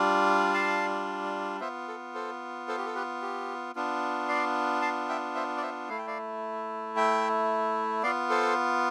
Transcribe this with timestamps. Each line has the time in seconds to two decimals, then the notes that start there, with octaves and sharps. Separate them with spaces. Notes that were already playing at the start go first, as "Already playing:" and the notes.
Already playing: G3 D4 F4
0.54 F5 A5
1.60 B3 F4 C5 E5
1.88 A4
2.15 A4 C5
2.68 A4 C5
2.78 G4
2.86 A4
2.95 G4 B4
3.22 G4
3.75 B3 D4 F4
4.29 D5 F5
4.82 F5 A5
5.09 E5 G5
5.35 C5 E5
5.57 D5
5.62 C5 E5
5.89 A3 E4 F5
5.98 G5
6.07 D5 F5
6.96 E5 G5
8.03 B3 D5 F5
8.07 F4
8.30 A4 C5